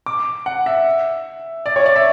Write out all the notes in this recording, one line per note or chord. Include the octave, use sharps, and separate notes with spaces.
D6
F#5
E5
D5
C#5
D5
E5